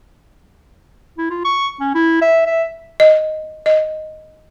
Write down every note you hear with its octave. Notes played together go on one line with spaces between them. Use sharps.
E4
F4
C#6
C#4
E4
E5
E5
D#5
D#5